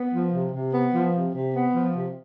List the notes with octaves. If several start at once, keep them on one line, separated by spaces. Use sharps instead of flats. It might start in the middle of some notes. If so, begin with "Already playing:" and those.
Already playing: B3
F3
C3
C3
B3
F3
C3
C3
B3
F3
C3